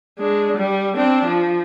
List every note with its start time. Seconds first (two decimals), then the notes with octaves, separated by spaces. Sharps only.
0.19 G#3 D4
0.57 G3
0.95 C4 D4
1.25 F3